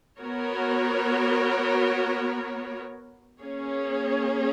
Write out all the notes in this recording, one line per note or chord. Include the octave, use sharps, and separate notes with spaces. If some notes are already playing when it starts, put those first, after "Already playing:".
B3 F#4 A#4 C#5
A#3 C#4 G#4 C#5